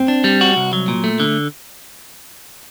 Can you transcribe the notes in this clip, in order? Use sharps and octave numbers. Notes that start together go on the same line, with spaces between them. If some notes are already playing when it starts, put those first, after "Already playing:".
Already playing: C4
D4
G3
F#4
C2
F#3
A#2
A3
D3